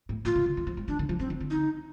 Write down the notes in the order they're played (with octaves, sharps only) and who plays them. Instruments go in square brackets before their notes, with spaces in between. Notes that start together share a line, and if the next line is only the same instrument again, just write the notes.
[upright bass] A2
[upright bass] A#2 [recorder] F4
[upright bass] C3
D3
D#3
F3
G3
[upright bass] D#3 [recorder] D4
[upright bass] D3
F3
[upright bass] F3 [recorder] C4
[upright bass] D#3
D3
[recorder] D#4